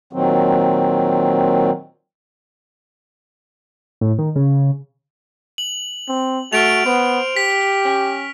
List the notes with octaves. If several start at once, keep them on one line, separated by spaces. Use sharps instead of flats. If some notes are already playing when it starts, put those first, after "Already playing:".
A#2 D#3 F#3 C4
A2
D#3
C#3
F#7
C4
A3 F#4 F6 D7 F7
B3 C5
G4 B6
C#4